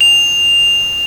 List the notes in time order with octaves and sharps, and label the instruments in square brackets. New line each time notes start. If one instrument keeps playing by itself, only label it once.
[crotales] F7